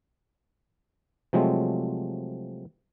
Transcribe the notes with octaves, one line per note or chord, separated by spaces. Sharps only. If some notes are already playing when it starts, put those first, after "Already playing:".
C3 F3 F#3 G#3 A3 C4